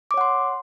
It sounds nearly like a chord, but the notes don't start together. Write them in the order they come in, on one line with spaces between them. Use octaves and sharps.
D6 C#5 F#5 C6